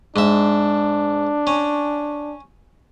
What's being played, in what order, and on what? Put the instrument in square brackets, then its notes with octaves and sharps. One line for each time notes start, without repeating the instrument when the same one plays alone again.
[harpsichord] G#2 E5 [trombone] D4
[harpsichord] C#4